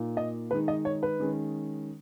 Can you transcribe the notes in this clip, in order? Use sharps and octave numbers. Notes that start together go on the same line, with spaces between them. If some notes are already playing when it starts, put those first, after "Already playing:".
Already playing: A#2 A#3 D#4
D#5
D#3 G#3 D#4 B4
D#5
C#5
B4
D#3 G#3 C#4